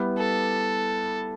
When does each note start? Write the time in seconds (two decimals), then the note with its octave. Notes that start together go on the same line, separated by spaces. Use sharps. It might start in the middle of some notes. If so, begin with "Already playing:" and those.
Already playing: G3 B3 E4 G4 B4
0.19 A4